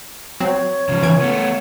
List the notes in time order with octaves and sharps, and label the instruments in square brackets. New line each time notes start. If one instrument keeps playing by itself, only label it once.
[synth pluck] F#3 C4 [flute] C#5
[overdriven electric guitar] C#3 F3
[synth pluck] E3 G#6 D7
[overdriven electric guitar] A3 B3